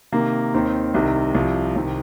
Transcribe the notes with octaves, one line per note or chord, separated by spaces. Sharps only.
C3 D#3 A#3
D#2 D#3 C4 D#4
C2 C3 D#3
C2 C3 F3
C2 C3 D#3 C4